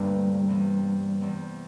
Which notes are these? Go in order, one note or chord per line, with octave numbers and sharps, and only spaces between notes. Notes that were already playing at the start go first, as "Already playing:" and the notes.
Already playing: D2 G2 C3 G3 A#3 E4
E2 C3 E3
E2 C3 E3